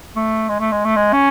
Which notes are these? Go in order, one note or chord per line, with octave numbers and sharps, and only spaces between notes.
A3
G#3
A3
G#3
A3
G#3
C#4